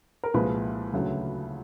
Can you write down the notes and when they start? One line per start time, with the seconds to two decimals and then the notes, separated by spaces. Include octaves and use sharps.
0.24 A#4
0.34 C2 A#2 F3 G#3 B4
0.93 D2 C#3 F#3 A3